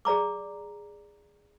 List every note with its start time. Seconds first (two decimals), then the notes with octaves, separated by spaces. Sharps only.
0.05 G#4 D5 A#5 D6